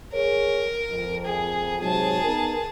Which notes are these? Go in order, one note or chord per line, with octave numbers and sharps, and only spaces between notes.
G#4 A#4 C#5
F2
G#4
G#2 C3 F#3 G#4 A5
B3 D#4 A#4